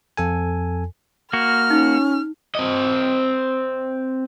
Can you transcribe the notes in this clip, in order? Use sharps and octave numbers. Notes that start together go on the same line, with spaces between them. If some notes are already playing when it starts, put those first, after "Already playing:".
F2 A4 G#5
A#3 F#4 F6
C#4 D#4
C4 D#5